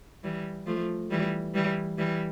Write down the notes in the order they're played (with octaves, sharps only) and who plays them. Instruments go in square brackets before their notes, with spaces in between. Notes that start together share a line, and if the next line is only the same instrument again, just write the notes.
[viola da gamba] E3 G3
F3 A3
E3 G3
E3 G3
E3 G3